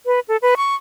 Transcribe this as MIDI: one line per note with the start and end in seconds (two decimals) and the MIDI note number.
0.06 0.20 71
0.29 0.37 69
0.42 0.55 71
0.57 0.75 85